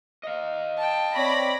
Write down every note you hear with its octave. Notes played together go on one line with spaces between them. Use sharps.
D#5 F5
G5 A5
C4 C#5 D5 B5 A#6